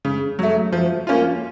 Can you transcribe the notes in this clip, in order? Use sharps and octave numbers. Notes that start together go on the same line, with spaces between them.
C#3
F#3 A3
F3
A#3 C#4 F4